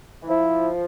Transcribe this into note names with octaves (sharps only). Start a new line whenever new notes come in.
E3
F3 E4